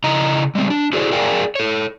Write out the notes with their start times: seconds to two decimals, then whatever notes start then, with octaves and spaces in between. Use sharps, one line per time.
0.04 C#3 E4 D#5 A#5
0.55 G3 G#3 C4
0.70 D4
0.93 E4 F#4 G#4 A4 C5 D5
1.12 G#4 A#4 D5 F5 G5 G#5
1.55 A4 C#5